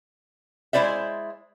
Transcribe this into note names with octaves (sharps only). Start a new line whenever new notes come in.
G#3 E4 F4 C5 D5 E5